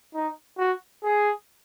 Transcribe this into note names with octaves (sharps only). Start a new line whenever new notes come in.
D#4
F#4
G#4